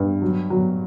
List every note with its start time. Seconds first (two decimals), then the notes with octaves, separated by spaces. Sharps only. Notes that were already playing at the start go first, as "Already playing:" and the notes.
Already playing: G2
0.22 F#3
0.50 F#3